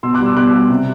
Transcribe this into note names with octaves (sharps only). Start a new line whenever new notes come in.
B2 C6 E6
D6 F#6
G3
C6 E6
B2 D6 F#6
G3
C3